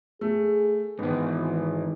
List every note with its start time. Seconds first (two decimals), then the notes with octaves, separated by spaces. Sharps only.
0.21 A3 G#4
0.99 G#2 D#3 E3 B3